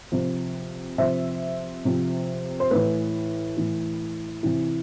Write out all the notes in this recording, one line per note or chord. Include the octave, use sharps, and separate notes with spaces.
C3 F3
C3 F3 C5 E5
C3 F3
C5
A2 E3 B4
A2 E3
C3 E3